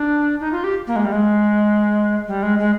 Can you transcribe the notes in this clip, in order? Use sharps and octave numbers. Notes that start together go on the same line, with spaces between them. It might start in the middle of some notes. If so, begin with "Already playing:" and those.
Already playing: D4
D#4
F4
G4
A#3
G#3
G3
G#3
G3
G#3
G#3